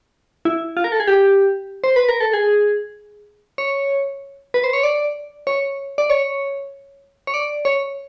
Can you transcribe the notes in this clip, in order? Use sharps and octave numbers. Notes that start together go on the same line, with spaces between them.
E4
F4
A#4
A4
G#4
G4
C5
B4
A#4
A4
G#4
C#5
B4
C5
C#5
D5
C#5
D5
C#5
C#5
D5
C#5